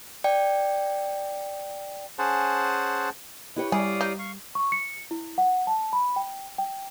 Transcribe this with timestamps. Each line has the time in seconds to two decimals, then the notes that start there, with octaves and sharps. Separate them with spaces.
0.24 D5 G5
2.19 C#4 G#4 C5 F#5 A5
3.56 E4 G4 B4 C#5
3.72 G3 G#4 D5 F5 D#6
4.01 D#4
4.19 F5 C#6
4.55 C#6
4.72 C#7
5.11 E4
5.38 F#5
5.67 A5
5.93 B5
6.16 G5
6.58 G5